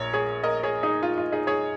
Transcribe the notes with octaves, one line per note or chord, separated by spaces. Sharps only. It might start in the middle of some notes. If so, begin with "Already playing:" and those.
Already playing: A#1 A#4 C#5
G#4 C#5
A#4 D#5
G#4 C#5
D#4 G#4
F4
F4
D#4 G#4
G#4 C#5